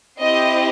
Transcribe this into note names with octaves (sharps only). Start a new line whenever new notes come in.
C4 E4 G4 D#5